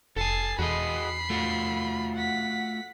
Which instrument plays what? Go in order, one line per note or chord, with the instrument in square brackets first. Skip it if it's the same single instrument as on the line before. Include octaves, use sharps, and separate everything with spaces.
[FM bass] F1 [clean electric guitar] A4 G#5 [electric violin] A5 C7
[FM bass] E2 [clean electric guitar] F#4 G#4 D#5 [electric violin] B5 C7
[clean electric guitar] A3 F4 F#4
[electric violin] F#5 B6